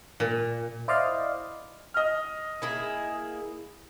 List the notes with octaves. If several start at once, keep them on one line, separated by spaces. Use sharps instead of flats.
A#2
E4 C5 D5 D#5 F5
D#5 F6
A#3 E4 G#4